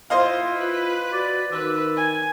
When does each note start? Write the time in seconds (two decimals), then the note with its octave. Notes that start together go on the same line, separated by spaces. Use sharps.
0.10 E4 F4 C5 D#5 F5
0.59 F4 B4
1.13 F#4 D5
1.53 D#3 B4 E6
1.97 G#5